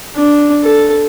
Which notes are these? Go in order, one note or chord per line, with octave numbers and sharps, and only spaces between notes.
D4
A4